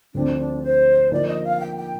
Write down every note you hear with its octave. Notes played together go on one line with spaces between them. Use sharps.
D2 D3 F3 C4 D4
D4
C5
D3 F3 A#3 D#4 D5
D#5
F5
G5
G5